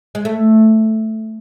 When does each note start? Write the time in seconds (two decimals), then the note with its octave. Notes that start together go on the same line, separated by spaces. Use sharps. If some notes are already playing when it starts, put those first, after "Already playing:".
0.15 G#3
0.25 A3